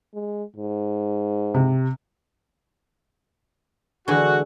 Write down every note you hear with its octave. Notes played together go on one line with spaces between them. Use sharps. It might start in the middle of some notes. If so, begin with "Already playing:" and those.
G#3
G#2
C3
D3 E3 G#3 F#4